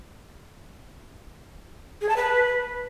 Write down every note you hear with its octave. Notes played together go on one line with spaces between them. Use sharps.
G#4
A5
B4